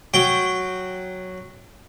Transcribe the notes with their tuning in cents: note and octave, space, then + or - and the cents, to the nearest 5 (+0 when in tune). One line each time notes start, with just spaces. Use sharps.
F#3 +0 G5 +0